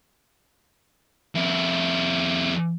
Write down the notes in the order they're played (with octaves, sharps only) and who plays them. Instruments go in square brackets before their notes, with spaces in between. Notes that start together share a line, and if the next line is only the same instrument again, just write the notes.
[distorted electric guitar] F2 E4